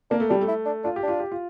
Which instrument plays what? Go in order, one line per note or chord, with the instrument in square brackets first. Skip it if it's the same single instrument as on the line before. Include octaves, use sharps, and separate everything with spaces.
[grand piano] A#3 [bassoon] D4
[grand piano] A3
[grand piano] G3 [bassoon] D4
[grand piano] A3
[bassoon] E4
D4
[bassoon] D4 [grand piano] F4
[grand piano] G4
[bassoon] D4
[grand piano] F4
G4
F4